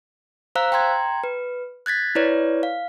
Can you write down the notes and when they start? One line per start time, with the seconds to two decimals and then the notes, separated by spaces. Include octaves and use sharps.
0.55 C5 F5 A#5 E6 F#6
0.72 G5 A#5 C6 G#6
1.24 B4
1.86 F#6 G#6 A6 B6
2.15 E4 B4 C#5 D5
2.63 F5